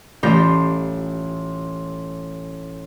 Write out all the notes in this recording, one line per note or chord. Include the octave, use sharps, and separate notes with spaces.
A1 G3 A3 F4 G6 A#6